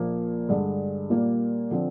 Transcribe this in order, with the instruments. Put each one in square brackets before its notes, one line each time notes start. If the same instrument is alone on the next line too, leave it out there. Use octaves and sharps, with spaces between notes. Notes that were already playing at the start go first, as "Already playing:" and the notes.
Already playing: [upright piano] A#1 A#2 F3 A#3
G2 D3 G#3
A#2 G3 A#3
D3 F3 C4